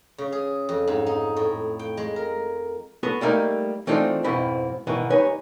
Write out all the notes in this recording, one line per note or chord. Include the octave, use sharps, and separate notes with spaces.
C#3
G#4
F2
G#2
D#4
A2
G5
G#3
A#4
B3 F#4 A4
G3 A3 A#3 D#4
E3 A3 C4 D4 D#4 F4
F2 G#2 B2 C4 E4 B5
G#2 B2 D#3 E3
G2 D#4 B4 C#5 G#5